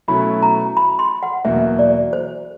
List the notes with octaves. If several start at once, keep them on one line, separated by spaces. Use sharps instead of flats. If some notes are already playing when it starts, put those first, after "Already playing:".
B2 F#3 A3 C#4 E4 B5
A#5
B5
C6
F#5
E2 B2 F#3 A#3 E5
D5
C5